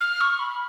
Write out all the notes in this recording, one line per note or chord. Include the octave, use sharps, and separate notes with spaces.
F6
C#6
B5